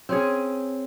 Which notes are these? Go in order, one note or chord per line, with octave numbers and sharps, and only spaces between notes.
C4 C#4 G#4